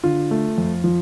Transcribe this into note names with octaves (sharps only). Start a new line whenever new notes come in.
D3 F4
A3
F2
F3